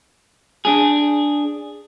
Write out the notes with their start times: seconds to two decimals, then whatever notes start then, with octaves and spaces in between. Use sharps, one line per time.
0.65 D4 G#4